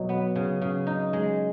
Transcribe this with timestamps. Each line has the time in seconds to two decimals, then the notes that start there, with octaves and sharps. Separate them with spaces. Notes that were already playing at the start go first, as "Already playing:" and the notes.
Already playing: B2 F#3 D#4
0.09 B3
0.36 C#3
0.62 C#3
0.87 D#4
1.13 G#3